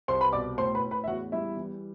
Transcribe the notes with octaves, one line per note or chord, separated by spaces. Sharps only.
C2 C5 C6
B4 B5
B2 D5 D6
A2 C5 C6
B4 B5
A2
B4 B5
E5
E2 F#4 F#5
G3 E4 E5
E3